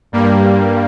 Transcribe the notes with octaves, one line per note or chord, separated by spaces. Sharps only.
G2 G3 A#3